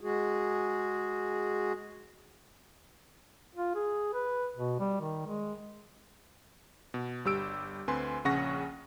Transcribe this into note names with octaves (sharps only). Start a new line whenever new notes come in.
G#3 F#4 G#4
F4
G#4
B4
B2
G3
D#3
G#3
B2
G1 G3 G4 E6 D7
D2 C4 B4 G#5 C6
A#1 C#3 C#4 F#5 C#6 A#6